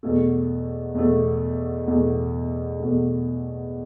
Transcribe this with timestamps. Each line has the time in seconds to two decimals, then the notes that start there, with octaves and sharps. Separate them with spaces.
0.03 E2 B2 A3
0.95 E2 B2 A3
1.87 E2 B2 A3
2.79 E2 B2 A3